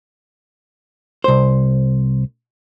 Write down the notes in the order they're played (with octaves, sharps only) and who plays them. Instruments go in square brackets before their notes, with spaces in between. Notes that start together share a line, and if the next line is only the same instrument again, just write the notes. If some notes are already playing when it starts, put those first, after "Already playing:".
[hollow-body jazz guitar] C2 C5